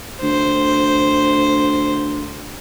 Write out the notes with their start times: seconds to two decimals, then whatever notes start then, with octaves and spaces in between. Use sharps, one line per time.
0.22 D2 C5